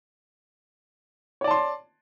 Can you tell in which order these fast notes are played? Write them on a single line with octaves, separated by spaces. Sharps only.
C#5 D5 A5 C6